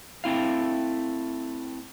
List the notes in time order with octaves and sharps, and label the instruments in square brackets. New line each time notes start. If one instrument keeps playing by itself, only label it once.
[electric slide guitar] A3 C4 E4 F5